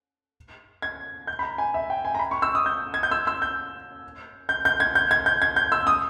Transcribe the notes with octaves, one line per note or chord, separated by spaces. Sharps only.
G#6
G6
B5
A#5
G#5
E5
G5
G#5
A#5
B5
C#6
E6
D#6
G6
G#6
G6
E6
E6
G6
G6
G6
G#6
G6
G#6
G6
G#6
G6
E6
D#6